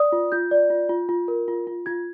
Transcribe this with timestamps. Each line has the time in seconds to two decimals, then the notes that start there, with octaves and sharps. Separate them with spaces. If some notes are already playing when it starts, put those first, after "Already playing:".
Already playing: D5 D#6
0.12 F4
0.32 F4 G6
0.51 D5
0.70 F4
0.89 F4
1.09 F4
1.28 A#4
1.48 F4
1.67 F4
1.86 F4 G#6